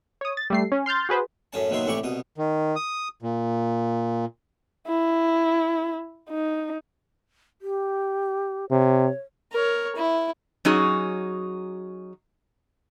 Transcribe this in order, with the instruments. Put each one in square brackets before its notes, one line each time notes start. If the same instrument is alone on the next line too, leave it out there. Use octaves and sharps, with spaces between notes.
[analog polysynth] C#5 D#6
A6
G3 A3 C7
C#4
C6 F6 G6 A6
F#4 G#4 B4 C5
[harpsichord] F#2 A2 C#4 A5
D#2 B2 D#3 F#3 E5 C6
C2 A2 E3 E4 G4 C#6
C2 B2 D#6
[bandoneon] D#3
D#6
A#2
[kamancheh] E4
D#4
[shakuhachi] G4
[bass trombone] C3 [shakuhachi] C#5
[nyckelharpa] A#4 C#5
E4
[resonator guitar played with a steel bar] F#3 C#4 D#4 F#4 G#4